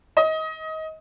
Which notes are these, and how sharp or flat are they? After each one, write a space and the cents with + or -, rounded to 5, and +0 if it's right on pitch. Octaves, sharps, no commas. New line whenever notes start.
D#5 +25